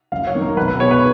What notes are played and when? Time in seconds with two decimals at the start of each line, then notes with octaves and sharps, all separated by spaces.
0.12 F#1 F5
0.27 C#5
0.34 F#2 D#3 A#3
0.42 A#4
0.56 B1 B4
0.68 B4
0.80 B2 G#3 B3 C#5
0.91 B4